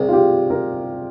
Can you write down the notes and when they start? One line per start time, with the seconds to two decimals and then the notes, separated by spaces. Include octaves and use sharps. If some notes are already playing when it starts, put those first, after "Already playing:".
Already playing: C2 G#4 A#4
0.09 F4
0.13 G4
0.50 A#4